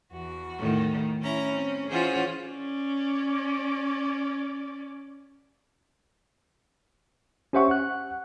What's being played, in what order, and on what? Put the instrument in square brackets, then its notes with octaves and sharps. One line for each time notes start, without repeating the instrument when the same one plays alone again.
[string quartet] E2 F#4
[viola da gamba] A2 D#3
[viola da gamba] C#4 [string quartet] E4 A#5
[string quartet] C4
[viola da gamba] E3 C#4 F4 [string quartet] G#4 C5 F#5
[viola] C#4 D5
[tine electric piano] C#4 G4 C5 E5 F#5 C#6
F#5 F#6